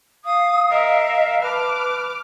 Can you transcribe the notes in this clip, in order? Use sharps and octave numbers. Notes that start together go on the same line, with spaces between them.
F5 D#6
A#4 D#5 E5
B4 A5 D6 F6